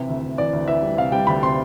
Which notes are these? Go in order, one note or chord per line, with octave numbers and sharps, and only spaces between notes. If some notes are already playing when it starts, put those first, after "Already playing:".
Already playing: C3 E3 E5
D2
D2
E3 D5
D2
E3 E5
G3
C3 F5
G3 G5
D2 B5
C3 C6